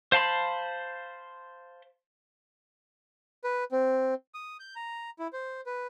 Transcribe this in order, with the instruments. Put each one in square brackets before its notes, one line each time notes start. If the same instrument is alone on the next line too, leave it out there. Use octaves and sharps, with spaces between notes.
[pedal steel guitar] C5 F5 A5 B5 C6
[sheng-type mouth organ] B4
C4
D#6
G6
A#5
E4
C5
B4